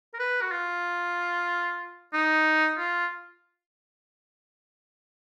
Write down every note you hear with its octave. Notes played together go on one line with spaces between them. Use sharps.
A#4
B4
F#4
F4
D#4
F4